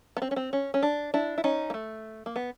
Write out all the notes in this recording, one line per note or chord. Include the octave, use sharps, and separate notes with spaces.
B3
C4
C#4
C4
C#4
C#4
D4
D4 E4
E4
C#4 D#4
A#3
A3
A#3
B3